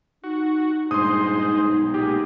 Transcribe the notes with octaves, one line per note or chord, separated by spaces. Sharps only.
D#4 F#4
G2 A#2 G#3 D4 D#4 C5 C6 D#6
B1
A#2 G#3 G4